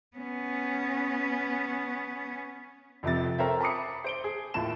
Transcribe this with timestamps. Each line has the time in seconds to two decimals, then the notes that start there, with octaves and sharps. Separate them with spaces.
0.17 B3 C#4
3.03 F1 F2 C3 A6
3.38 A4 A#4 C5 C#5 E5 G5
3.61 A5 B5 D6 D#6 C#7
4.04 C5 D7 G7
4.24 G#4
4.54 D#2 A2 E4 F4 A5 E7